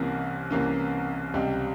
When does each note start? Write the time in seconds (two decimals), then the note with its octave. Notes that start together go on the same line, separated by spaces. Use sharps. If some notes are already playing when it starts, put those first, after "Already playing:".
Already playing: C2 C3 E3 A#3 C#4
0.51 C2 C3 E3 A#3 C#4
1.34 C#2 C3 G3